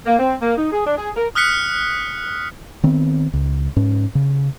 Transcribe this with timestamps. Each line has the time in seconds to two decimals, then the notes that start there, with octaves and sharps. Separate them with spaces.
0.05 A#3
0.18 C4
0.41 A#3
0.56 D#4
0.72 G#4
0.85 D4
0.97 G#4
1.16 A#4
1.35 D#6 F6 F#6 B6 C#7
2.84 D#3 B3 C4
3.33 C#2
3.76 G#2 C#4
4.15 C#3